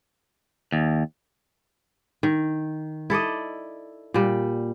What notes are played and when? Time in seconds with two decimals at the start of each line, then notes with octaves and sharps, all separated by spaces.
0.72 D#2
2.23 D#3
3.10 E4 A4 D5 D#5
4.14 A#2 G3